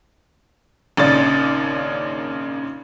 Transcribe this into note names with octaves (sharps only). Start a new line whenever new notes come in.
G#1 A#2 C#3 D4 A6